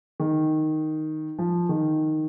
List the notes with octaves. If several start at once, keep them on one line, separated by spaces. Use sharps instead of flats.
D#3
F3
D#3